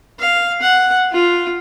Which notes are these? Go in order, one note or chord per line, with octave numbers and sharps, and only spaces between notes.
F5
F#5
F4